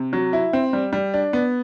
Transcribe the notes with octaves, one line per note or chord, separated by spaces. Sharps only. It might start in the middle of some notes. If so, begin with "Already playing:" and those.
Already playing: C3
F#3
E4
C4
G3
G3
D4
B3